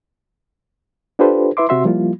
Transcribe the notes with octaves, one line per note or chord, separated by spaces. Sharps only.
D4 F4 G4 A4 B4 C5
E4 B4 E5 C6 D6
C3 F#4 E5 C6
F3 G3 A#3 E4 F4